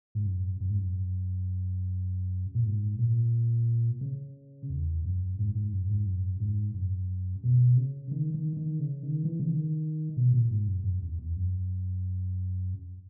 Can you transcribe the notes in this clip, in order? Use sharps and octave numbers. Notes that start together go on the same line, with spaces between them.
G#2
F#2
F#2
G#2
F#2
A#2
G#2
A#2
C#3
E2
F#2
G#2
G#2
F#2
G#2
F#2
G#2
F#2
B2
C#3
D#3
D#3
D#3
C#3
D#3
E3
C#3
D#3
B2
A#2
G#2
F#2
F#2
E2
E2
F#2